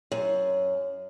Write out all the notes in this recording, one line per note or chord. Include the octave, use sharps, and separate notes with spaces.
F#2